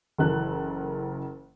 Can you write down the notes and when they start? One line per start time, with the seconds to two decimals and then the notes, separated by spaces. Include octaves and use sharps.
0.18 F#1 E3 A4 A#4 F#6